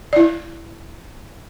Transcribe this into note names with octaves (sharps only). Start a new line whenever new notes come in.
E4 D5